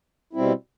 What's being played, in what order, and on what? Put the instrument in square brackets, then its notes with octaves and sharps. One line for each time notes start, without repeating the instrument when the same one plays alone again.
[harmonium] B2 G3 C4 E4